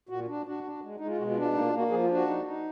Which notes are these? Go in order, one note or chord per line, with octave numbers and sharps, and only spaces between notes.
A#2 F#4
D4
D4 F#4
D4
G#3
G#3 D#4
F4
B2 F#4
F4
D4
F4
A#3 D#4
F4
A#3
F#4
F3 G#4
F4
D4
F#4
D#4
D#4